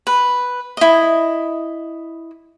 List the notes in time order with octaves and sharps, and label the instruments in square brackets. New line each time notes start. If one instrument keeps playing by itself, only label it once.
[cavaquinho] B4
E4 D#5